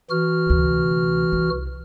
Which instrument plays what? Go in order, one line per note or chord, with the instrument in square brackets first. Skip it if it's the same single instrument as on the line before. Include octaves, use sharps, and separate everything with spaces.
[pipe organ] E3 F#4 F6
[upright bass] D2 C3
C2